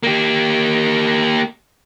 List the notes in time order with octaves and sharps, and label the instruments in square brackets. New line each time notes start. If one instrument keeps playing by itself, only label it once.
[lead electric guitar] A#3 G4